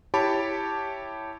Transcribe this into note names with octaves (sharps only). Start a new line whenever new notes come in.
E4 G4 C#5 A5 B5 D6